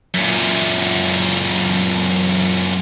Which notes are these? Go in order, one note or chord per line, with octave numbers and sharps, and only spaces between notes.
F#2 A#2